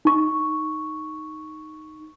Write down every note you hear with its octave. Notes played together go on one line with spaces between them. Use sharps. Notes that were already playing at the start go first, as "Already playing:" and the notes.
D#4 C#6